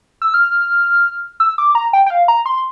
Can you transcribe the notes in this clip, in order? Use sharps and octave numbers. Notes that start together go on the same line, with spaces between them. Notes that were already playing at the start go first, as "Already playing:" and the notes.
E6
F6
E6
D6
A#5
G5
G5
F5
A#5
C6